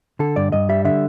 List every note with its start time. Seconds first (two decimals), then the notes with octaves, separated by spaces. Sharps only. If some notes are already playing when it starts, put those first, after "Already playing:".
0.19 D3 A4
0.36 G2 D5
0.52 G2 D#5
0.69 G3 E5
0.85 D3 E5